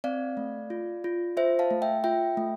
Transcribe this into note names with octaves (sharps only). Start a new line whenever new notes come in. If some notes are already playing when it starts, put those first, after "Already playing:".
C4 D5 F5
A3
F4
F4
F4 C5 E5
F5 A5
A3
E5 G5
F4 E5 G5
A3